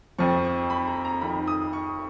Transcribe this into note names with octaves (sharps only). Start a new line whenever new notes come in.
F2 F3 C#6
C#6
B5
A#5
A#5
F2 D#3 B5
D#6
C#6